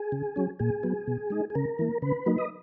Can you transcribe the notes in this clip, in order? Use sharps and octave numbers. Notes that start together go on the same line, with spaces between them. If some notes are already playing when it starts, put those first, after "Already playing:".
Already playing: G#4
C#3
F#3 C#4
A#2 G#4
F#3 B3
B2
G#3 D#4
G#4
C#3 A#4
E3 A#3
C#3 B4
F#3 A#3 D#4
D#5